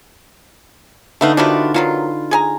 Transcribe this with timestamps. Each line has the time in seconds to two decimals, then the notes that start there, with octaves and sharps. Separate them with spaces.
1.21 D3 A3 B3 D#4 F5
1.37 C3 D#3 D4 F4 F#4 B4
1.74 B2 D#3 F#3 F4
2.31 G#4 G#5 A#5